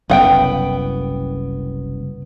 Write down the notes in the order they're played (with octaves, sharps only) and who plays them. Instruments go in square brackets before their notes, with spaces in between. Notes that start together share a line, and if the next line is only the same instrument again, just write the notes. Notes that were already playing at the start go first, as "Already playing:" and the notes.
[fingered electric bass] F#1 C2 F#2 [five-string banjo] B3 F#5 G5